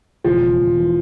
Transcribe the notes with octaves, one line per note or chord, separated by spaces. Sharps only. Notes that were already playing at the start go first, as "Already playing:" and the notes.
E1 F3
E1
E1
E3